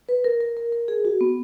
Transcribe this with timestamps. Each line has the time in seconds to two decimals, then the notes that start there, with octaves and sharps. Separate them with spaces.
0.09 B4
0.24 A#4
0.41 A#4
0.57 A#4
0.72 A#4
0.88 G#4
1.05 F#4
1.21 B3